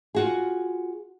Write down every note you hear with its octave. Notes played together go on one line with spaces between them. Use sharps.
F4 F#4 G#4